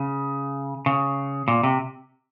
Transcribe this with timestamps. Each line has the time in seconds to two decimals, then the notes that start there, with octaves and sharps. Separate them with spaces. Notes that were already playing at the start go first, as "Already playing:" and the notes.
Already playing: C#3
0.86 C#3
1.48 A#2
1.63 C3